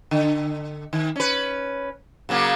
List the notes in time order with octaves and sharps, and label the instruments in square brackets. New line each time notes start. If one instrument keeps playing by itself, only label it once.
[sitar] D3
D#3
C#4 B4
C#3 F#3 A#3